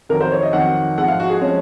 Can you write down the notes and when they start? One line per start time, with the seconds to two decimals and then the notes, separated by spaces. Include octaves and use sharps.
0.09 F2 D#3 F#3 A#4
0.21 C5
0.32 C#5
0.43 D#5
0.53 F2 D#3 F#3 F#5
0.98 G#2 F3 G#3 F#5
1.08 F5
1.20 F#4
1.30 G#4
1.41 F3 G#3 C#4